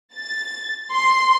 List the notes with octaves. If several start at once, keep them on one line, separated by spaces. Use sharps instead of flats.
A6
C6